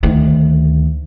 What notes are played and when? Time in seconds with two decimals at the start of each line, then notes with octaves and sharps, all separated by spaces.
0.03 D2 D#3